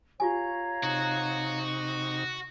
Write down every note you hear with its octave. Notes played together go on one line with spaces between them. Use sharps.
F4 G4 C#5 F5 G#5 A#5
C3 D#4 F#4